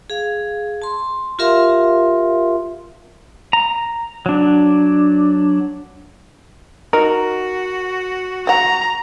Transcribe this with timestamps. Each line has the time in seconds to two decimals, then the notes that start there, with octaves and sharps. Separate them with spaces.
0.10 G#4 F5
0.82 A5 C6
1.39 F4 G4 A#4 E5 F5 C6
3.53 A#5
4.26 F#3 D4
6.93 D#4 F#4 A#4
8.47 F#5 G5 A#5